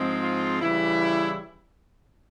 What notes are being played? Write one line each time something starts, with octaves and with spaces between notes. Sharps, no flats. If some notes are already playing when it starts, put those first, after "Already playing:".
Already playing: G#2 F3 G#3 C4
F4
C#3 E3 G3 E4